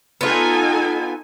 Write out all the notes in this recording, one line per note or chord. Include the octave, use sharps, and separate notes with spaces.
B3 D#4 F4 A4 G#5